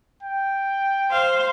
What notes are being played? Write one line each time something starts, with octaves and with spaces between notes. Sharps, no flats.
G5
C5 F5